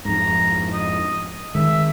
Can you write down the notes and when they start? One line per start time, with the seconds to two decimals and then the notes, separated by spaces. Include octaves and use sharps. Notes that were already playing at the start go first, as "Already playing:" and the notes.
0.05 F2 G#2 A#5
0.73 D#5
1.55 D#3 G#3 E5